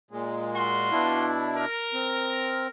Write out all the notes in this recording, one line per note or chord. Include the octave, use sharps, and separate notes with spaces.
A#2 G#3
F4 F#4 C6
B2 D4 E4
A#4
C4